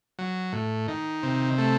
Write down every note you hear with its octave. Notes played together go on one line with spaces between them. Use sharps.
F#3
A2
D#3
C3
A3